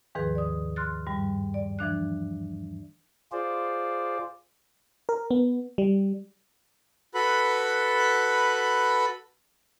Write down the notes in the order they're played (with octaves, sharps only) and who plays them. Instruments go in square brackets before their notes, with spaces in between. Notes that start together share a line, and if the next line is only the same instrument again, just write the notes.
[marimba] D#2 G#2 D#3 F3 G#4 B4
D5 D#6
C6 F6 F#6 A6
G2 G3
D5
E3 F3 D4 F#6
[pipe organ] F4 G#4 C5 D5
[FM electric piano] A#4
B3
G3
[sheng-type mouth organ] F#4 A4 B4 B5